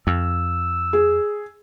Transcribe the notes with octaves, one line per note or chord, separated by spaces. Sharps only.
F2 E6
G#4